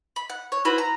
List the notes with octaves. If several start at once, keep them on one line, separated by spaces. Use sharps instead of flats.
B5
F#5
C#5
E4 F#4 B4 C5
A#5